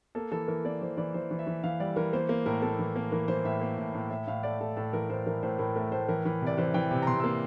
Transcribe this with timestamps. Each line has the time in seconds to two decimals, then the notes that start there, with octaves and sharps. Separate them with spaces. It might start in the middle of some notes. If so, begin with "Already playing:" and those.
0.15 A#3 A4
0.32 E3 A4
0.48 E3 A#4
0.65 A#3 D5
0.81 E3 C5
0.97 E3 D5
1.14 E3 C5
1.31 E3
1.39 E5
1.47 E3
1.64 E3 F5
1.80 G3 D5
1.96 E3 A#4
2.13 A#3 C5
2.29 A#3
2.46 A2 A#4
2.62 A#3 A4
2.79 E3
2.96 A#3
3.12 E3 A#4
3.28 E3 C5
3.45 A2 E5
3.61 A#3
3.78 A2
3.94 A2
4.11 A2 E5
4.27 A2 F5
4.43 A3 D5
4.60 A2 A4
4.77 A2 A4
4.93 E3 A#4
5.10 A2 C5
5.26 E3 A#4
5.43 A2 C5
5.59 A2 A#4
5.76 A3 A#4
5.92 A2 C5
6.09 E3 A#4
6.25 E3
6.42 C3 D5
6.58 E3 C5
6.74 E3 G5
6.91 C3
7.02 A#5
7.07 C3 C6
7.20 A#3 E6